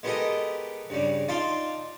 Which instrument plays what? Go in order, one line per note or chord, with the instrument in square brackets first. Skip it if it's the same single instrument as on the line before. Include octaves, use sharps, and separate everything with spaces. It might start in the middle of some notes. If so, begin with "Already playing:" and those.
[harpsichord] G#3 B3 G4 A4 A#4 D#5
G2 C#3 G3
D#4 F4 D5 F5 A5 C6